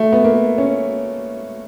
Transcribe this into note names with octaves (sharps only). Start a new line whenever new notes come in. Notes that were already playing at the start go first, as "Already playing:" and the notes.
Already playing: A3
B3
A#3
C#4